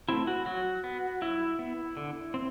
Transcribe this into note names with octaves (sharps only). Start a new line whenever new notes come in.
A3 C4 E4
F#4
F#3 F#4
B3
F#3 E4
B3
D3
C4